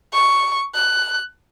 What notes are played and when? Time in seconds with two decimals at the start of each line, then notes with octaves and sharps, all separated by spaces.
0.13 C#6
0.74 F#6